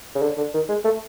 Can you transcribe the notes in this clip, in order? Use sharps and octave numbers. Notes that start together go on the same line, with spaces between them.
C#3
D3
D3
D#3
G#3
A3